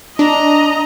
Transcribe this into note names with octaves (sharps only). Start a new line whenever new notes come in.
D4 D#5 A#5